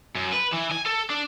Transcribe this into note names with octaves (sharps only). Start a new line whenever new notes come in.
F#2
B4
E3
G#5
A4
D4